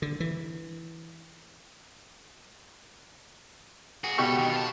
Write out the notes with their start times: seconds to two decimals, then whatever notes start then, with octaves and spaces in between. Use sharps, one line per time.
0.02 D3
0.20 E3
4.04 F#4 G#4
4.18 C#2 B2 G4 A4 C#6
4.38 D3 D#3
4.52 F4 A5